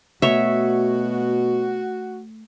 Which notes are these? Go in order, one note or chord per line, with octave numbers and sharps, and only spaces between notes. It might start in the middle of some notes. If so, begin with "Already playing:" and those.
B2 A3 F#4 C#5 E5